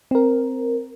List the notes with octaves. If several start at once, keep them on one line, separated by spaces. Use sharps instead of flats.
C4 A#4